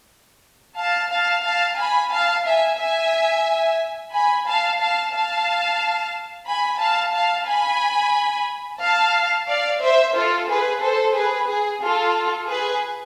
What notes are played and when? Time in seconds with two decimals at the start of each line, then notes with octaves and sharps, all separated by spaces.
0.78 F5 A5
1.12 F5 A5
1.45 F5 A5
1.78 G#5 B5
2.12 F5 A5
2.46 E5 G#5
2.79 E5 G#5
4.12 G#5 B5
4.46 F5 A5
4.79 F5 A5
5.12 F5 A5
6.47 G#5 B5
6.80 F5 A5
7.13 F5 A5
7.47 G#5 B5
8.80 F5 A5
9.47 D5 F5
9.81 C5 E5
10.14 F4 A4
10.48 G#4 B4
10.81 A4 C5
11.14 G#4 B4
11.48 G#4
11.82 F4 A4
12.48 G#4 B4